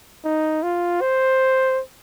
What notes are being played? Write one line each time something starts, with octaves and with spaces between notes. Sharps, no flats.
D#4
F4
C5